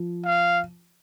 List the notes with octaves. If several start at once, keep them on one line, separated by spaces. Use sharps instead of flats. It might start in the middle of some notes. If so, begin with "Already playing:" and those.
Already playing: F3
F5